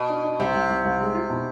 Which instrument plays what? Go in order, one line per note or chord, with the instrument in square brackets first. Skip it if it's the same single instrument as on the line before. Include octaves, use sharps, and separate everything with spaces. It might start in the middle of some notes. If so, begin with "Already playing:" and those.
Already playing: [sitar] B2
[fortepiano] D4
D4
[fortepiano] C2 [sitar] C3
[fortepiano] C2
C2
C2
G#3
F4
B2